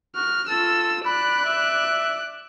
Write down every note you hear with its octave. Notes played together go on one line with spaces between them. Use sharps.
F#4 F6
F4 A4 E6
D5 B5 F#6
E5